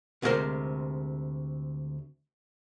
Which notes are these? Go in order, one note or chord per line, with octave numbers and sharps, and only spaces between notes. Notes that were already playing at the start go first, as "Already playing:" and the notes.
D2 C3 G#3 D#4 A#4 C5